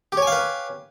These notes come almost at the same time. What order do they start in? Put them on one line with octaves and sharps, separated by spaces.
G4 C#5 G#5 F5 B4